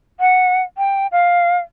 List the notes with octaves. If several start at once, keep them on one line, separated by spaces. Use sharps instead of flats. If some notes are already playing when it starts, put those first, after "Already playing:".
F#5
G5
F5